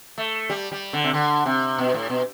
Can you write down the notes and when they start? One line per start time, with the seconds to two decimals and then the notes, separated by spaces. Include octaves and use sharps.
0.18 A3
0.50 G3
0.72 G3
0.93 D3
1.04 C3
1.13 D3
1.45 C3
1.78 B2
1.94 A2
2.10 B2